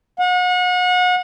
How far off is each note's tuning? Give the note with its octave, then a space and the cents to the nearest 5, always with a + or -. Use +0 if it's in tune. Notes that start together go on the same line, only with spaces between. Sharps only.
F#5 -35